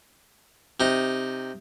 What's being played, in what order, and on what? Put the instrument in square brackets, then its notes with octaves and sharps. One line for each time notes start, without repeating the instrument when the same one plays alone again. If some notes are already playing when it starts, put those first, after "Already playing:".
[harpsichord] C3 D#4